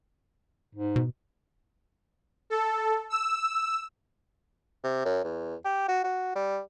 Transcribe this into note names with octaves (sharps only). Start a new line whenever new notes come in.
G#2
B2
A4
E6
C3
F#2
E2
G4
F#4
F#4
G3